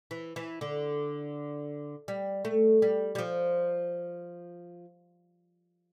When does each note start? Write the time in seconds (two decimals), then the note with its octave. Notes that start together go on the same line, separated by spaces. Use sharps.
0.11 E3
0.36 E3
0.61 D3
2.08 G3
2.45 A3
2.82 G3
3.15 G3
3.18 F3